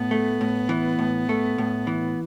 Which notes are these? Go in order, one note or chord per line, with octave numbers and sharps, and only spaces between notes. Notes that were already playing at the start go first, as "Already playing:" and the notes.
Already playing: A2 B3
A3
A2
E3
A2
A3
A2
E3